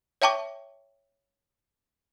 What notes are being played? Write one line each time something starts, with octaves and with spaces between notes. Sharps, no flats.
C#5 E5 G5 A5 C#6 D6